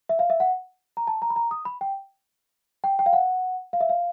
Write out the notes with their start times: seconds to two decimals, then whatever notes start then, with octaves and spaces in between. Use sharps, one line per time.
0.09 E5
0.19 F5
0.30 E5
0.40 F#5
0.97 A#5
1.07 A5
1.22 A#5
1.30 B5
1.36 A#5
1.51 D#6
1.65 B5
1.81 G5
2.84 G5
2.99 G5
3.06 F5
3.13 F#5
3.73 F5
3.81 E5
3.89 F5